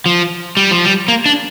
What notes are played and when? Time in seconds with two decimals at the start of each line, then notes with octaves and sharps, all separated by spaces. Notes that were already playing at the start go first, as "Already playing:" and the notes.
0.06 F3
0.57 G3
0.71 F3
0.84 G3
1.08 A#3
1.26 D4